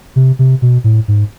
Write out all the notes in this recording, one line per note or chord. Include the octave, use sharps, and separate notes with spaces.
C3
C3
B2
A2
G#2